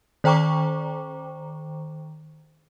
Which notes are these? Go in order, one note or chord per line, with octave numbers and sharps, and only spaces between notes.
D#3 C5 G5 A#5 C#6 D6